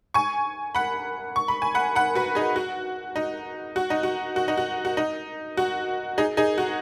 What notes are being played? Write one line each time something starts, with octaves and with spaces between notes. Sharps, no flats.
G#5 C#6
F#5 B5
C#6
B5
G#5
F#5 B5
F#5 B5
F#4 B4
D#4 G#4
F#4
D#4
F#4
D#4
F#4
F#4
D#4
F#4
F#4
D#4
F#4
D#4 G#4
D#4 G#4
F#4